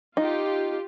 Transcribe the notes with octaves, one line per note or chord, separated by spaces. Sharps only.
D#4 F4 G4